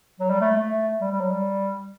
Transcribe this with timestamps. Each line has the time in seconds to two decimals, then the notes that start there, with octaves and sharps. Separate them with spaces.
0.20 F#3
0.30 G3
0.41 A3
0.56 A3
1.01 G3
1.11 G3
1.20 F#3
1.31 G3